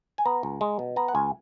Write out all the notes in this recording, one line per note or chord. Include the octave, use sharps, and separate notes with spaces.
G#5
B3 A#5
C#2
G#3
B2
B3 A#5
F#5
C#2 G#5